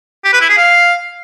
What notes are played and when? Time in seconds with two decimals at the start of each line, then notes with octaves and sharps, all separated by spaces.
0.24 G4
0.33 B4
0.41 E4
0.49 G#4
0.57 F5